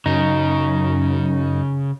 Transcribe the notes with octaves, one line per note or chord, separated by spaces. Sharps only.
F#2 C#3 D#4